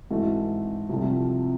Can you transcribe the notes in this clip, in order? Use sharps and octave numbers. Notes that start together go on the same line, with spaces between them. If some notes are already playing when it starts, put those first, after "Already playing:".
G#2 E3 A3 F#4
C2 C3 F3 A3